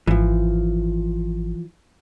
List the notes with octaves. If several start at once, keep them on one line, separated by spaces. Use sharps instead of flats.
G#1 E3 F3